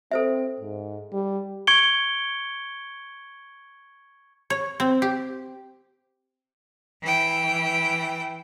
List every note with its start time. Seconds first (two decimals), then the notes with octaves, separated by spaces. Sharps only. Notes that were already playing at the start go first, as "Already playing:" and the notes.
0.11 C4 A4 C5 E5
0.60 G#2
1.12 G3
1.67 C#6 G#6 C#7 D7 G7
4.50 C#5
4.80 C4
5.02 G4
7.02 E3 G5